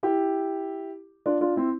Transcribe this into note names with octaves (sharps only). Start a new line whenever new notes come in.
E4 G4
D4 F4
D4 F4
C4 E4